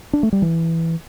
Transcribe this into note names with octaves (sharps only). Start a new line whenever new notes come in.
D4
A3
G3
E3